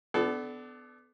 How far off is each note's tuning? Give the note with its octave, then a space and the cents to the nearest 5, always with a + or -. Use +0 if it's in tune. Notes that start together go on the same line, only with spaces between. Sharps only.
B3 +25 D4 +0 A4 -25